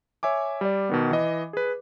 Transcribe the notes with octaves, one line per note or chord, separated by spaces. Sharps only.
C#5 E5 G#5 D6
G3 D5
B2 D#3 B3
E3 D#5
G#4 B4